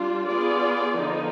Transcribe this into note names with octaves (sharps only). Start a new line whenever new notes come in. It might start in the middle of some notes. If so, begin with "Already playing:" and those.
Already playing: G3 D4 F4
B3 F4 G#4 D5
D3 F3 B3 D#4